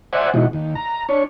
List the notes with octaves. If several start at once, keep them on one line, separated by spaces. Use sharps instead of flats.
C5 D5 E5 F#5 G#5
B2 E3 G#3 D#4 F#4
D#2
A#5
D4 C#5